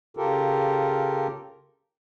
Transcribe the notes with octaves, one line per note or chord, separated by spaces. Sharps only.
C#3 F4 G4 A4 A#4